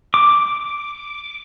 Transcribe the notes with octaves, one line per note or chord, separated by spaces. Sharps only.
D6